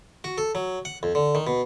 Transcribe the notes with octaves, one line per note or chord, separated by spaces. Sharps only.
F#4
A4
F#3
F#5
F2
D3
D#3
B2